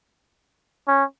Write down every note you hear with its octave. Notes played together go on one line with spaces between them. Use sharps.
C#4